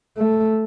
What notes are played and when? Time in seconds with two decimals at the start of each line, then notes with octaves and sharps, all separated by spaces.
0.18 A3